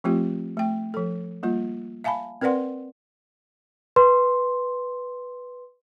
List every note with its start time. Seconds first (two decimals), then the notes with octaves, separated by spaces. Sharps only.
0.04 F3 A3 C4 F4 G4
0.57 A3 G5
0.94 F3 A4
1.43 G3 A#3 F4
2.04 E5 F5 G#5 A5 B5
2.41 C4 A#4 B4 D5 F#5 C6
3.96 B4 C6